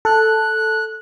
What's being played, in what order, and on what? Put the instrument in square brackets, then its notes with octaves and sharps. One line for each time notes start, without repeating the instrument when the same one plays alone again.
[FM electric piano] A4 [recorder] F#6